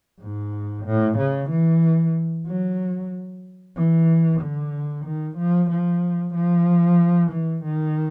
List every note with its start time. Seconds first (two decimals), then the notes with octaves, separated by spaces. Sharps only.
0.21 G#2
0.86 A2
1.18 C#3
1.50 E3
2.47 F#3
3.76 E3
4.41 D3
5.05 D#3
5.38 F3
5.71 F3
6.35 F3
7.32 E3
7.64 D#3